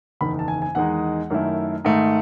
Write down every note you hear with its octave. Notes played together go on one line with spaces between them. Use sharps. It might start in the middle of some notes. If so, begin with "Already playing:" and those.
F#1 E2 D#3 B5
A5
G#5
G#5
E2 D#3 G#3 D#4 F#5
F#2 D#3 A3 E4
G#2 D#3 A3